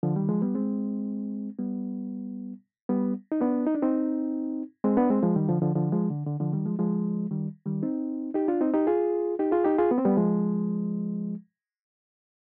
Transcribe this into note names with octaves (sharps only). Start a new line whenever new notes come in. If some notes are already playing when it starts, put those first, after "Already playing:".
D3 F3
D#3 G3
F3 G#3
G3 B3
G#3 C4
G3 B3
G3 B3
D#4
B3 D4
D#4
D4
C4 D#4
G#3 C4
B3 D4
G#3 C4
F3 G#3
D#3 G3
D3 F3
D3 F3
D3 F3
F3 G#3
D3
D3
D3 F3
D#3 G3
F3 G#3
F3 G#3
D#3 G3
D#3 G3
C4 D#4
D#4 G4
D4 F4
C4 D#4
D#4 G4
F4 G#4
D#4 G4
F4 G#4
D#4 G4
F4 G#4
B3
C4
G3 B3
F3 G#3